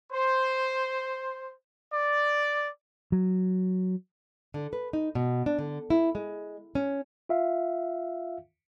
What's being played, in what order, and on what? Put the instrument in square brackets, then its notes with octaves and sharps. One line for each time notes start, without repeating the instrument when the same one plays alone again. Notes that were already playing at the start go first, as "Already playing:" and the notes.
[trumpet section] C5
D5
[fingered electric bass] F#3
[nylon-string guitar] D3
B4
D#4
B2
D4
D3
E4
G#3
C#4
[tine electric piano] F4 E5 F5